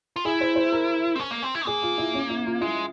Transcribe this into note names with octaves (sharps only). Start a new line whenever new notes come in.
F4
E4 G#4
C5
C5
A#4
C4
C#4
A#3
C4
E4
A#3 G#4
F4
E4
C#4
E4
F4
G#3 E4